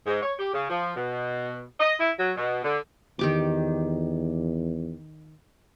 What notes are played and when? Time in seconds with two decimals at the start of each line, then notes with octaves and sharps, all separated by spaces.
0.06 G#2
0.23 C#5
0.39 G4
0.54 C#3
0.70 F3
0.96 B2
1.80 D#5
2.00 E4
2.19 F#3
2.37 B2
2.64 D3
3.19 E2 D#3 G4 D6